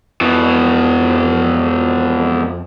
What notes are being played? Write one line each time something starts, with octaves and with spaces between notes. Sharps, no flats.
F2 B2 E3